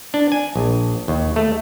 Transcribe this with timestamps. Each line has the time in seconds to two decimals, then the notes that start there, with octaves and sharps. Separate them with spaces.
0.14 D4
0.32 G#5
0.56 A#1
1.08 D#2
1.36 A3